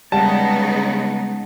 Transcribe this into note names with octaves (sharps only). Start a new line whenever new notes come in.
C#3 G3 G#3 B3 D#4 F#5 A5